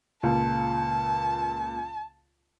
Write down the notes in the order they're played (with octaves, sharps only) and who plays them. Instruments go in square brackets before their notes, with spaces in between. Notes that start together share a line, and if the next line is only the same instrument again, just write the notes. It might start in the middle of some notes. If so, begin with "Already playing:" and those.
[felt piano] C#2 A#2 [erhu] A5